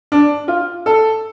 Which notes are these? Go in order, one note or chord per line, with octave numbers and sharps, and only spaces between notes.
D4
F4
A4